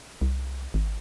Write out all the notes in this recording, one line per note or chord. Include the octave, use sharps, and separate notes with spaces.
C2
G#1